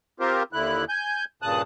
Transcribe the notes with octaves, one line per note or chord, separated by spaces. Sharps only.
C4 F4 G4 A#4 C5
D#2 D3 E4 F#6
G#5 G6
G2 A#2 C#3 A5 D#6 F#6